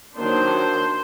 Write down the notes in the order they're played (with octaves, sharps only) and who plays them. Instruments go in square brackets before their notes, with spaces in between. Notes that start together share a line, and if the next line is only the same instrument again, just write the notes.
[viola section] D#3 F#3 A#3 D4 C5